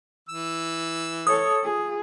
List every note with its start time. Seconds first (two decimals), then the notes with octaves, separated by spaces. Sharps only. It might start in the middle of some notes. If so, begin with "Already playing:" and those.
0.29 E3 E6
1.27 A4 C#5 D#6
1.63 F4 G#4